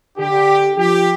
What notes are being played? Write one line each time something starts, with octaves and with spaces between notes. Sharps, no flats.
D3 G4
F3 G4